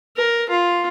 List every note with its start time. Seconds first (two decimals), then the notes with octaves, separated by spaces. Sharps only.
0.17 A#4
0.50 F4